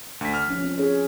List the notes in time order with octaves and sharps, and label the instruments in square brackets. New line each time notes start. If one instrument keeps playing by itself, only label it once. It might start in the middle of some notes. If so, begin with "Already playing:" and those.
[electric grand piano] D2 B6
F6
[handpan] F3 C#4
C4 C#4
C#4 G#4 C#5